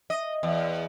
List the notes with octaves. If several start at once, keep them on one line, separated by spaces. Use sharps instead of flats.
D#5
E2